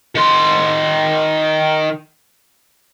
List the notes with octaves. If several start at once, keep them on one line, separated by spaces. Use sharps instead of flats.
D#3 C6